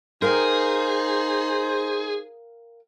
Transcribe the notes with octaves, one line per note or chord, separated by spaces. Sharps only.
D#4 G#4 A#4 C5 F5 G5